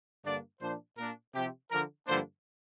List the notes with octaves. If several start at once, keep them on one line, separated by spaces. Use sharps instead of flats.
G2 D3 A#3 D4 D5
A#2 F3 D4 C5
A#2 A#3 D4 A#4
C3 F3 C4 G4
D3 F3 D4 A#4
G2 D3 F3 A#3 D4 C5